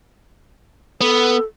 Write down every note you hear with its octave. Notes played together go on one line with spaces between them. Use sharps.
B3 A4